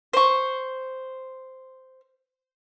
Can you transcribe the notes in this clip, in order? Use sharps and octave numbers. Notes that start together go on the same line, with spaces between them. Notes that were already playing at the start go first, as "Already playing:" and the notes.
C5 C#6